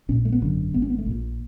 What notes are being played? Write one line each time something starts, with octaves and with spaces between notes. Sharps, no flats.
A#1 A#2 C#4
A3
B3
G#1 F#2 D3
G#1 G#2 B3
C#4
B3
A3
A#1 A#2